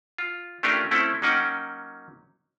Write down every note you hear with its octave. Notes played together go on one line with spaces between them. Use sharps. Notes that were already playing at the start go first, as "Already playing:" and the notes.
F4
A3 C#4 D4 F4 G4 A#4
A3 C4 C#4 E4 A4
F#3 A#3 C#4 D#4 F#5 G5